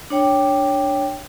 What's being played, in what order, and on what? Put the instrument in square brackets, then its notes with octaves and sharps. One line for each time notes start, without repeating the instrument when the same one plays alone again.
[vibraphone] D4 C#5 G5